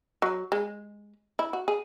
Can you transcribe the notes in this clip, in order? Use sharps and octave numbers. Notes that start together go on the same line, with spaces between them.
F#3
G#3
E4
F#4
G#4